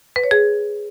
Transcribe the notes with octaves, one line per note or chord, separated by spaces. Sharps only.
B4
C#5
G#4